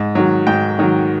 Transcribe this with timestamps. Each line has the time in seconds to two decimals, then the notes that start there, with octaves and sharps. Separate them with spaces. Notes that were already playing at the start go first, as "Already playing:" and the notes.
Already playing: G#2
0.15 D#3 F#3
0.47 G#2 G5
0.79 D#3 F#3